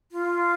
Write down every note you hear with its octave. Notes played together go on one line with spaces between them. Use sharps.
F4